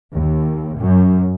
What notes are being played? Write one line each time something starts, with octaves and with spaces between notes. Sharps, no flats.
D#2
F#2